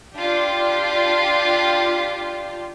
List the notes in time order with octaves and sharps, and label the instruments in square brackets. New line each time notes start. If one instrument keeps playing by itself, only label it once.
[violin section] D4 F4 G4